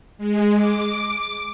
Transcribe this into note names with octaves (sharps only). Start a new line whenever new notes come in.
G#3
D6